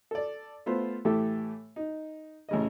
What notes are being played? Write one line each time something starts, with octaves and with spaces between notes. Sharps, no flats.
A4 D5
A3 B3 F4 C5
A2 E3 A3 G4 A4
D#4
A1 C#3 D#5